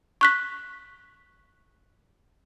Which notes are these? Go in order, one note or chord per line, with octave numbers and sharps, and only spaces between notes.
C#6 F#6 B6